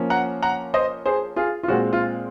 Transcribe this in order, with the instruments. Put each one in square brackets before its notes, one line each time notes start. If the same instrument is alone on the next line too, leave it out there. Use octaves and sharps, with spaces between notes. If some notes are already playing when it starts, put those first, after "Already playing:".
Already playing: [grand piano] F3 A#3 C#4
F#5 A#5
F#5 A#5
C5 D#5
G#4 C5
F4 G#4
F4
A#2 G#3 C4 F#4
F4